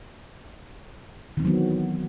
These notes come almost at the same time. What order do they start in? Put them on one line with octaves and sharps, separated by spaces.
D#3 C4 E3 F#3 B3